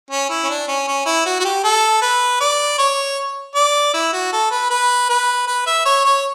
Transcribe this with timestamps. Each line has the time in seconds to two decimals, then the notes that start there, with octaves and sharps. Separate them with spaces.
0.11 C#4
0.30 E4
0.44 C#4
0.49 D4
0.68 C#4
0.88 C#4
1.06 E4
1.26 F#4
1.40 F#4
1.45 G4
1.64 A4
2.02 B4
2.40 D5
2.78 C#5
3.55 D5
3.94 E4
4.13 F#4
4.33 A4
4.51 B4
4.70 B4
5.09 B4
5.47 B4
5.66 E5
5.85 C#5
6.05 C#5